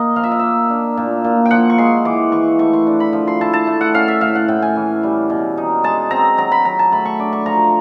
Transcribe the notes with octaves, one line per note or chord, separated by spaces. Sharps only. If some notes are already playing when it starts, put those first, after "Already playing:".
Already playing: A#3 D#4 D#5
F3 F5
E5
D#5
A#3 E5
D4
A#2
A#2
G5
F3 F#5
C#6
G#3 C6
E3 D6
E3 C#6
A3 C#6
C6
D4
B5
F3
C6
E4 A5
A5
A3
F#5
C#4 F5
E5
A2 F5
F#5
A2 G5
G#5
E3
G3
B2
D#4
G#3 A5
C4 A#5
F#3 A#5
B5
F#3 A#5
A5
A3 B5
C#6
D4 D6
C#6
F3 A#5